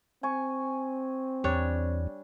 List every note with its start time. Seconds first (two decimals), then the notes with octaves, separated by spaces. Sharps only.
0.23 C4 G#5 C#6
1.44 E2 G3 D4 C#5